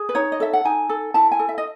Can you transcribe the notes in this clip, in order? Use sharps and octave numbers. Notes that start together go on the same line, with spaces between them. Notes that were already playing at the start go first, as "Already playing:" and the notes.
Already playing: G#4
B4
D#4 C#5
D#5
A4 E5
F#5
D#4 G#5
A4
E4 A5
G#5
A4
E5
D#5